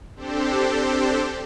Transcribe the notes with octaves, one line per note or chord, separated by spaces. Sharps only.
C4 D4 G4 A4 C5